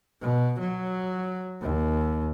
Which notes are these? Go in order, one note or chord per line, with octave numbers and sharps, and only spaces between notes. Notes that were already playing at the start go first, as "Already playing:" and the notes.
B2
F#3
D#2